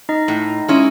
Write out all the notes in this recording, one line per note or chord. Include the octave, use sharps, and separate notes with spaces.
D#4 D#5
A2
G#3 C#4 E4